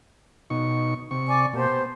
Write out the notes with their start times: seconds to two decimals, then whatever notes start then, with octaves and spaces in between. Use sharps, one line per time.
0.50 B2 D#4 C#6
1.11 C3 C#6
1.27 D5 G#5 D6
1.53 B2 A#3 G4 C5 A5
1.67 B3